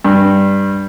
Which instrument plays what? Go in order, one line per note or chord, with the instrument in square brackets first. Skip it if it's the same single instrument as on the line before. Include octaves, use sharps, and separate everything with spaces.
[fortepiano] G2